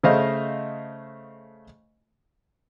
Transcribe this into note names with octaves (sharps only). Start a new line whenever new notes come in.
C#3 A3 C5 D#5 F5